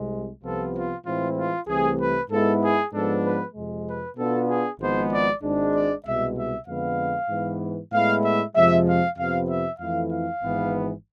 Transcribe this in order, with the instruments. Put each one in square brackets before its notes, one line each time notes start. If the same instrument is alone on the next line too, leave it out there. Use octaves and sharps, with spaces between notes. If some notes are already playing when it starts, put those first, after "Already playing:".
Already playing: [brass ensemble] C2 C3 G#3
C2 C3 F3 B3 F4 A4
F4
A2 E3 G#3 C4 E4 F4
F4
C2 C3 E3 A3 G#4
B4
G#2 G#3 B3 E4 A4
G#4
G#2 F3 G#3 B3 D4 A4
B4
F2 C3 G#3
B4
B2 B3 D4 F4 A4
G#4
G#1 G#2 F3 G#3 B3 C5
D5
G#1 G#2 G#3 D4
D5
C2 B2 G#3 E5
E5
F2 D3 G#3 B3 F5
G#2 E3 B3
A2 G#3 B3 E4 F5
E5
F2 C3 F3 G#3 E5
F5
F2 C3 F3 B3 F5
E5
F2 E3 A3 E4 F5
F5
G#1 G#2 E3 B3